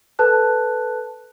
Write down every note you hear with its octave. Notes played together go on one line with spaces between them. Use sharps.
A4 B4 A5 F#6